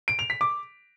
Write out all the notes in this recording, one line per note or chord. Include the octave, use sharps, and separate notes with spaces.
D7
F7
B6
D6